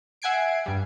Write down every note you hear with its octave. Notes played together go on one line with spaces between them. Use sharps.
E5 F#5 G#5 G#6 C7 D7
G2 G3